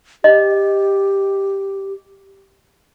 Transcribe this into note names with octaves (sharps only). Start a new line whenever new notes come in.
G4 D#5